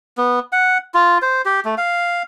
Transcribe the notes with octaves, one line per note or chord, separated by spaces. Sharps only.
B3
F#5
F4
C5
G4
A3
F5